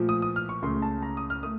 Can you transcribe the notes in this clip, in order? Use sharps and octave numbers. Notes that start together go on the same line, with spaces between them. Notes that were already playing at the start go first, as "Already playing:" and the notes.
Already playing: A#2 F3 A3
D#6
D#6
F6
C#6
C#2 C#3 A3 C6
A5
A#5
D#6
F6
A3 D#6